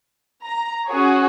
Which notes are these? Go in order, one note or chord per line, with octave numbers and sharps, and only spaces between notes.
A#5
C#4 F#4 G#4 C#5